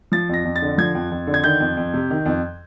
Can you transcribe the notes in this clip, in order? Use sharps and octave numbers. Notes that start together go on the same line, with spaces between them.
F3 A6
F2 A#6
F2
A6
D3
F3 G#6
F2
F2
D3
G#6
D#3 G6
F2
F2
C3
D#3
F2